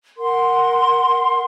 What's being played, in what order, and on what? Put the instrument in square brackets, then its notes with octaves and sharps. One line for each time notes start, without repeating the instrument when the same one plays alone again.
[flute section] A#4 F#5 C6